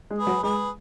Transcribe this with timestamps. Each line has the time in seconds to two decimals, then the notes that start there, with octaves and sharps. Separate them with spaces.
0.11 G#3
0.18 G#4 B4
0.27 F#3
0.43 G#3 G#4 B4